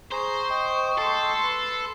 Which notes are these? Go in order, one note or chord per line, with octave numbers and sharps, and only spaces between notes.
G#4 C5 A#5 C#6
D#5 G5
A4 C6
B4